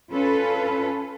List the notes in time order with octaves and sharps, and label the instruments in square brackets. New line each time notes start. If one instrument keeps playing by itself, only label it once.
[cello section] C#4 F4 A4 B4